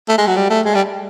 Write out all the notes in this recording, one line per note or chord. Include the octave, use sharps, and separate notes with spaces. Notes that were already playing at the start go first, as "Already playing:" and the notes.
A3
G#3
F#3
G3
A3
G#3
G3